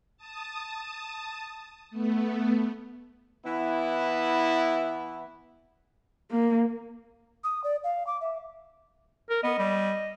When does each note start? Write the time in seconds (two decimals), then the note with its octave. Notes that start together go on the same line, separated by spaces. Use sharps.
0.17 A5 D#6
1.91 A3 B3
3.45 E3 B3 E4
6.31 A#3
7.44 D#6
7.64 D5
7.84 F5
8.07 D6
8.21 E5
9.30 A#4
9.43 B3 D#5
9.59 G3